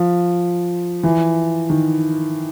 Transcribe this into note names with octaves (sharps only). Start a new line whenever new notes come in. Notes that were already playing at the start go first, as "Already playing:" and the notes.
Already playing: F3
E3
D#3